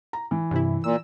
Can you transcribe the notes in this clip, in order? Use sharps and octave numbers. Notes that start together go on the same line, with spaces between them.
A#5
E3
G2 C3 E4
A#2 E6